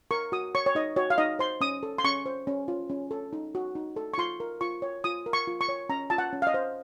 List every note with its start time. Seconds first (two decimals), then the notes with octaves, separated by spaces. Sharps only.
0.11 A#4 C#6
0.32 F#4 D#6
0.55 C#5 C#6
0.66 C#5
0.75 D#4 D#5
0.96 F#4 C#5
1.10 F5
1.18 D#4 D#5
1.39 C5 C6
1.61 C#4 D#6
1.83 A4
1.98 C6
2.04 C#4 C#6
2.26 C5
2.47 C#4
2.68 F4
2.90 C#4
3.11 A4
3.33 D#4
3.55 F#4
3.75 D#4
3.96 A4
4.14 C#6
4.18 F4 C6
4.40 A#4
4.61 F4 C#6
4.82 C#5
5.04 F4 D#6
5.26 A#4
5.33 C#6
5.47 F4
5.61 C#6
5.69 C#5
5.89 C#4 A#5
6.10 F4 A5
6.18 F#5
6.33 C#4
6.42 F5
6.47 D#5
6.54 C5